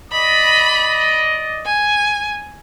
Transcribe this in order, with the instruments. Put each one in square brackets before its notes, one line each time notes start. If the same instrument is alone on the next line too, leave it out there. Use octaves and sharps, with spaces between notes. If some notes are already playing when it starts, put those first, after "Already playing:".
[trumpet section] D5 D#5 [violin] B5
[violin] G#5